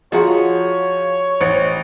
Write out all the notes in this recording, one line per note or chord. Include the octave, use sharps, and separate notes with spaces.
F3 F#4 G#4 C#5 D#5 F#5 A#5 C6
A1 C5 D#5